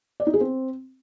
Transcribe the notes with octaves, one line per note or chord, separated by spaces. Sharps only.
D5
D#4
G#4
C4